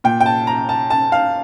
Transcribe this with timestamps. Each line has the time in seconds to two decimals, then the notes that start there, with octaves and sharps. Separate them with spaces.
0.04 A#2 G5
0.20 G5
0.26 A5
0.47 A#5
0.69 A5
0.90 A5
1.12 F5